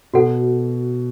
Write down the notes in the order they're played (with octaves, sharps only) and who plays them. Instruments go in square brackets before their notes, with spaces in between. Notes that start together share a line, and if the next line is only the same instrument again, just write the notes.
[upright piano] B2 [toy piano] F#4 A4 F#5